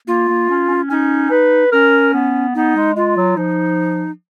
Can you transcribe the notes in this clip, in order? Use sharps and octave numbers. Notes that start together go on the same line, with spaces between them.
A#3 F4
A#3
C#4
C#4
C#4 D#4
B4
C#4 A#4
B3
B3 D#4
G#3
G#3 F4
F#3
F3 D#4